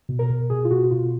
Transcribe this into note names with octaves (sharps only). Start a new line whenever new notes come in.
B2
A#4
B2
B2 G#4
F4
B2 F#4
B2 F4